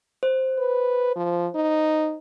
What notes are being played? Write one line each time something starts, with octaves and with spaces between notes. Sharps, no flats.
C5
B4
F3
D#4